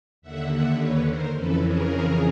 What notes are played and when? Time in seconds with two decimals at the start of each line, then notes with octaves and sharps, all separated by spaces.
0.22 D#2 D3 E5 F#5
0.50 E5 F#5
0.79 B4 C#5
1.06 A#4 C5
1.34 F2 C#3 E3 A4 B4
1.62 G#4 A#4